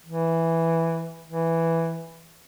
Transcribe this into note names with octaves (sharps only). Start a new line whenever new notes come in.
E3
E3